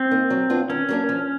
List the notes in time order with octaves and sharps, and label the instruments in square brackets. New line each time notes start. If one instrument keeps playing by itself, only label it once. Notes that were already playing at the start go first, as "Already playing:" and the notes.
Already playing: [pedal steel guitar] C4
[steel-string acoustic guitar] A#3 D#4
F#3
B3 D4 F4
[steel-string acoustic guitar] D#3 [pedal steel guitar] C#4
[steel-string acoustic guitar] F#3 A#3 D4
F3